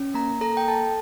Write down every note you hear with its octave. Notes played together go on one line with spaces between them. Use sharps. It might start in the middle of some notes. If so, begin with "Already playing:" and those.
Already playing: C#4
A#3 A#5
A4 A#5
G5
A4 A5